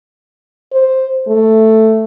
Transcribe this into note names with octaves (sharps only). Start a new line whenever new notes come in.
C5
A3